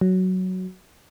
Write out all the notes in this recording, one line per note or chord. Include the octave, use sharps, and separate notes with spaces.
F#3